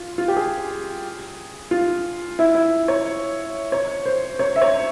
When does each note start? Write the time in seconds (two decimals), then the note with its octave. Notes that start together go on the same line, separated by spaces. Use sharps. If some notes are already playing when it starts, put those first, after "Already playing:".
Already playing: F4
0.18 F4
0.28 G4
0.36 G#4
1.71 F4
2.39 E4
2.55 E4
2.88 C#5
3.72 C#5
4.06 C5
4.39 C#5
4.56 E5
4.62 C#5